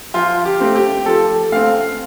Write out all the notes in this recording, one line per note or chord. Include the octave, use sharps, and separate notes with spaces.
F3 F4
G4
A3 C4
G4
F3 A4
A3 C4 F5